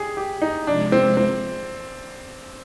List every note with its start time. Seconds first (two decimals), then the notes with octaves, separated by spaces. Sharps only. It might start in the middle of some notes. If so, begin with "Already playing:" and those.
Already playing: G4 G#4
0.17 G4
0.42 D#4
0.66 C3 F3 G#3 D4
0.92 C4
1.17 C4